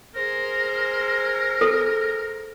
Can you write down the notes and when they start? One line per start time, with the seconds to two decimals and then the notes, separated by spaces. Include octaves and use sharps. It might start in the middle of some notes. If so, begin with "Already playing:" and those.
0.15 G#4 A#4 C5
1.61 A4